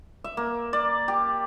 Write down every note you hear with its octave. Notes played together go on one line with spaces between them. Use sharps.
E5
A#3
D5
G4